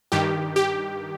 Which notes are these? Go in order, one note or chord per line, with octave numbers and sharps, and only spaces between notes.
G2 D#3 G4
G4